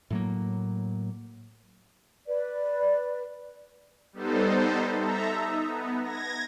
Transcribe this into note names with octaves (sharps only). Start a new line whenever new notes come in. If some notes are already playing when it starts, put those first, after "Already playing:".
A2 F#3 A#3
B4 D5
G3 B3 D#4 A4 C5
A4 E5 A#5
D#4
B3
G#6 A#6